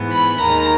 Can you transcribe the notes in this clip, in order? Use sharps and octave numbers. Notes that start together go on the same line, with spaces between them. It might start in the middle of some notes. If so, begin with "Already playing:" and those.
Already playing: G#2 E3 B3
B5
D#2 D#3 G#3 A#5